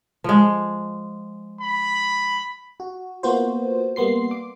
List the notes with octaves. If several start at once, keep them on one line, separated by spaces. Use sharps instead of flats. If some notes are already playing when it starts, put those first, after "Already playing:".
F3 G#3
B5
F#4
A#3 B3 F4 F#4 B4 C5
G3 A#3 B3 C6 C7
D6